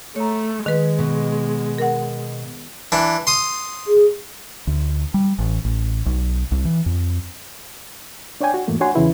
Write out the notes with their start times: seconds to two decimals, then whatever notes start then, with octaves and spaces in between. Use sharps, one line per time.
0.16 A3 C#5 A#5
0.66 D#3 G#3 B4
0.99 B2
1.78 A#4 F#5
2.92 E3 D4
3.27 C6 D#6
3.88 G#4
4.67 D2
5.14 G3
5.39 A1
5.65 A1
6.06 B1
6.51 C2
6.65 E3
6.86 F2
8.41 D4 C#5 D5 G5 G#5
8.54 F#4
8.68 E2 G#2 E3 A3 A#3
8.80 D4 F#4 C#5 F#5 G#5 C6
8.95 E2 C#3 E3 E4 B4